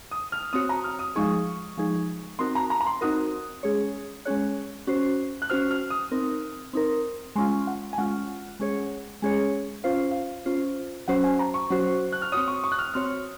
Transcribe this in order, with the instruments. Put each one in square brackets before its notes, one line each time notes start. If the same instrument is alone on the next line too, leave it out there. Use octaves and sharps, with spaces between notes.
[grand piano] D#6
F6
[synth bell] C4 F#4 C#5 [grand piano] D#6
[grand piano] A#5
F6
D#6
[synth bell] F3 G#3 D#4 G#4 [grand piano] C#6
[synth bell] F3 G#3 D#4 G#4
[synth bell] C4 D#4 F#4 A#4 [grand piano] C6
[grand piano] A#5
A#5
A#5
C6
[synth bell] C4 D#4 F#4 A#4 [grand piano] D#6
[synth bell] G#3 C#4 G#4 C#5
[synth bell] G#3 C#4 G#4 C#5 [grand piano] F#6
[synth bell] C#4 F#4 C5
[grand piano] F#6
[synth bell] C#4 F#4 C5 [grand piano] F6
[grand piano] F6
D#6
[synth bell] C4 D#4 A#4
C4 D#4 A#4
[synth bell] G#3 C#4 F4 [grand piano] C6
[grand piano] F#5
G#5
[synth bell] G#3 C#4 F4 [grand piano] F#5
[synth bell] G#3 C#4 G#4 C#5
G#3 C#4 G#4 C#5
[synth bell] C#4 F4 C5 [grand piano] F5
[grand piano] F5
[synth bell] C#4 F4 C5
[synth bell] F#3 C#4 F#4 C5 [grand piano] F#5
[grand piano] G#5
A#5
C#6
[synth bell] F#3 C#4 F#4 C5
[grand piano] F#6
F6
[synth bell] C4 F#4 C#5 [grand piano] D#6
[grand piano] C#6
C#6
F#6
F6
[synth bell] C4 F#4 C#5 [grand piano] F6